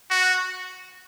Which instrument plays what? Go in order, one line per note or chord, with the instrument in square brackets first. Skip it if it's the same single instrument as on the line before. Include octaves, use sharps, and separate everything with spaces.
[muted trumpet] F#4